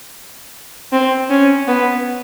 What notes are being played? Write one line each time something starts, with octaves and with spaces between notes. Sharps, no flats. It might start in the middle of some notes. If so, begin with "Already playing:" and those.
C4
C#4
B3